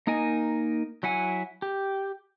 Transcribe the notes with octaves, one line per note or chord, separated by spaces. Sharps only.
A#3 D#4 A#4 D#5 G#5
F#3 E4 F#5 G#5
G4